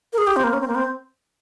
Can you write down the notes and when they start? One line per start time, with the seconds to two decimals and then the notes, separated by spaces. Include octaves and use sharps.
0.13 A#4
0.18 G#4
0.27 G4
0.36 C4
0.44 A#3
0.53 C#4
0.61 C4
0.68 A#3
0.75 C4